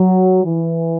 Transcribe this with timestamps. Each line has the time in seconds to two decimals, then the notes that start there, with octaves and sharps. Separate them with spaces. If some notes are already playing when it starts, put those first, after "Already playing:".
Already playing: F#3
0.45 E3